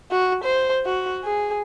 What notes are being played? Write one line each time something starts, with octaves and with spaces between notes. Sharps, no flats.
F#4
C5
F#4
G#4